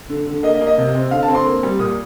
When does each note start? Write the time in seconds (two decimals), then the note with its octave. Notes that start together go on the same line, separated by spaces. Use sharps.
0.09 D3
0.27 D3
0.43 A#3 D#5
0.55 D#5
0.61 A#3
0.67 D#5
0.78 C3
0.95 C4
1.11 D3 F5
1.23 A5
1.28 C4
1.35 C6
1.46 A#3
1.63 G3
1.79 A#2 D#6